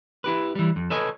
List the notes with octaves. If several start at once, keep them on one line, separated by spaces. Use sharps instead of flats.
E4 G4 B4
E3 G3
F2
A4 B4 C#5 D#5 G#5